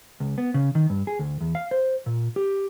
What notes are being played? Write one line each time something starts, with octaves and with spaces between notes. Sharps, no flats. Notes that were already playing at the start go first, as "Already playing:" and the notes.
C#2
B3
C#3
D#3
G2
G#4
D2
E2
F5
C5
A#2
G4